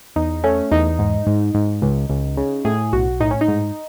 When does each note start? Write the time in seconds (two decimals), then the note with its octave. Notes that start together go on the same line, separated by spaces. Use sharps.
0.16 E2 D#4
0.44 A3 C#4
0.71 E2 D#4
0.99 G#2
1.27 G#2
1.55 G#2
1.82 C#2
2.10 C#2
2.37 C#3
2.65 A2 G#4
2.93 B1 F#4
3.20 A2 D#4
3.31 C#4
3.41 D#4
3.48 G#2